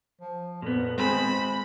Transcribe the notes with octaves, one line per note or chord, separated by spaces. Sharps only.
F3
F2 A#2 B3
G#3 C4 G#4 C5 B5